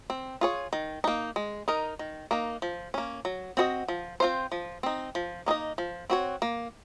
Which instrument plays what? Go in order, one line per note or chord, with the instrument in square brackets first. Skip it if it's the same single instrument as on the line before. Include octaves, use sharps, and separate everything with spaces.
[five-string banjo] C4
F4 G#4 C#5
D#3
A#3 D#4
G#3
D#4 A#4 D#5
D#3
A#3 D#4
F3
A#3 C#4
F#3
C4 F#4 C5 D#5
F3
C4 F4 C5
F3
C4 D#4
F3
A#3 D#4 G#4 D#5
F3
C4 F#4 C#5
A#3